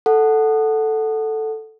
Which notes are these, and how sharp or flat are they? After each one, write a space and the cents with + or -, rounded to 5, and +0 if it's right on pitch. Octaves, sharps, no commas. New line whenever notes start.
A4 +0 F#5 +0